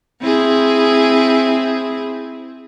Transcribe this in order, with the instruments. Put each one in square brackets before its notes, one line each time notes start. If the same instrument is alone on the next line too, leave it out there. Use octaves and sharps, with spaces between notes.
[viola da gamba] C4 E4 G#4